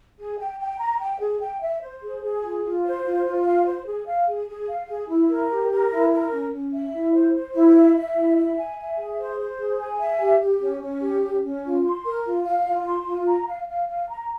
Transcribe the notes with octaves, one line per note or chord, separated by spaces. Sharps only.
G#4
G5
G5
A#5
G5
G#4
G5
E5
C5
G#4
G#4
F4
F4
C5
F4
F4
F5
C5
G#4
F5
G#4
G#4
F5
G#4
E4
A#4
G4
A#4
E4
A#4
C#4
C#4
E5
E4
C5
C5
E4
E5
E5
E4
E5
G#5
E5
G#4
C5
C5
G#4
G#5
E5
G4
G4
C#4
C#4
G4
C#4
C#4
F4
C6
A#4
F4
F5
F4
C6
F4
A#5
F5
F5
F5
A#5